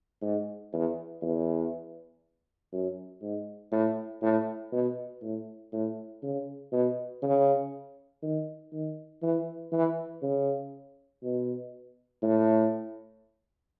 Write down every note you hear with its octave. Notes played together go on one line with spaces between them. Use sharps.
G#2
E2
E2
F#2
G#2
A2
A2
B2
A2
A2
C#3
B2
C#3
D#3
D#3
E3
E3
C#3
B2
A2